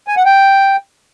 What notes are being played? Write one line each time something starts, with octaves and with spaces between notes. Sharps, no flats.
G#5
F#5
G5